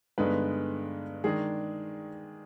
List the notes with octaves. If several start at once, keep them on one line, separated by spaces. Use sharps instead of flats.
G2 D3 G#3 B3 D#4 B4
D#3 G#3 D4 G#4